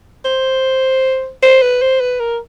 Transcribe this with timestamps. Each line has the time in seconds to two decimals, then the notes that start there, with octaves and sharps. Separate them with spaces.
0.25 C5
1.43 C5
1.62 B4
1.82 C5
2.00 B4
2.20 A#4